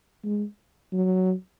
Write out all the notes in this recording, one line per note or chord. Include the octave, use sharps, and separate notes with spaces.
G#3
F#3